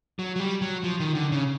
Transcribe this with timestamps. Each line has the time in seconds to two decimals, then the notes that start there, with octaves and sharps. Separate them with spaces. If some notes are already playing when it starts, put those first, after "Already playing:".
0.19 F#3
0.36 F#3
0.40 G3
0.62 F#3
0.84 F3
1.00 D#3
1.15 D3
1.32 C#3